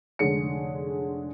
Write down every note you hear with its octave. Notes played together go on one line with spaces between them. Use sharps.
F1 D3 G#3 C#5 C#7